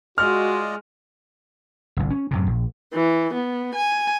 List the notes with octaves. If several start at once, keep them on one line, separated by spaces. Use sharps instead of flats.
G#3 F4 F#4 D5 D#5 F6
G1 C2
C#4
F#2 A2 C3
A#1
E3
B3
G#5